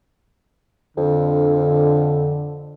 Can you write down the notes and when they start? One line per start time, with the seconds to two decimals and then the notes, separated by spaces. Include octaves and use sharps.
0.98 F2 D3